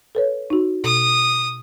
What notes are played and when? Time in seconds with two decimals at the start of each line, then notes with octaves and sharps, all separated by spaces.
0.15 A4 B4 C#5
0.50 D#4 F#4
0.84 B2 D#6